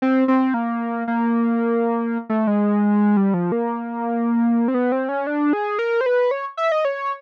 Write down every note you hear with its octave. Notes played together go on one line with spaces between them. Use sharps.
C4
C4
A#3
A#3
A3
G#3
G3
F3
A#3
C4
B3
C4
C#4
D4
G#4
A#4
C5
B4
C#5
E5
D#5
C#5